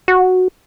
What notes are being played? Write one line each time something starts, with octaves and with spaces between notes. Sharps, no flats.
F#4